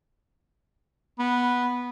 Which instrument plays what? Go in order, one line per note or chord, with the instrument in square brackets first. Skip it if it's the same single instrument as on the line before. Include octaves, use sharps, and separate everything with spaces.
[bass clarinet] B3